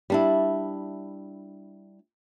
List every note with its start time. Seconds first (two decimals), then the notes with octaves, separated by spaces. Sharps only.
0.10 G3 D4 E4